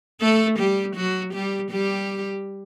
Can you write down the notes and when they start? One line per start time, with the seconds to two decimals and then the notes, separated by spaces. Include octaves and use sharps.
0.21 A3 A4
0.59 G3 G4
0.96 F#3 F#4
1.34 G3 G4
1.71 G3 G4